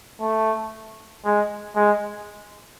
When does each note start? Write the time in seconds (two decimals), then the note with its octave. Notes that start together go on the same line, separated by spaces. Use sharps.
0.21 A3
1.25 G#3
1.76 G#3